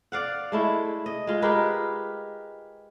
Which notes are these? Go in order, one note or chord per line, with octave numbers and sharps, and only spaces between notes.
D5 F5 F#5
G#3 A3 E4
D#5
G#3 F4
G#3 G4 A#4 B4